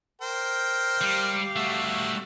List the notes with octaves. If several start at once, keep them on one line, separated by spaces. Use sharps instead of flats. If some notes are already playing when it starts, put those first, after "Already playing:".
A#4 C5 G5
G3 G4 F5
G3 A3 F#4 E5